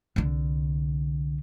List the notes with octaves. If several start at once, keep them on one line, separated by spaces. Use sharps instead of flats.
C2 D3